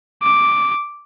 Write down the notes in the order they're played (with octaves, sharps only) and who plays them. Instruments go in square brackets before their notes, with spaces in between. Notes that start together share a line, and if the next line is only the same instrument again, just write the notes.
[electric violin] D6